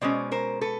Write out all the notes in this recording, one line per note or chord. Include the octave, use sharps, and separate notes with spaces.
B2 G#3 C#4 C5 D5
A#4 C5
A4 B4